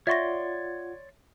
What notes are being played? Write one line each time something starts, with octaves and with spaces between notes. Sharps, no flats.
F4 C#5 D5 E5 F#5 C6 C#6 A#6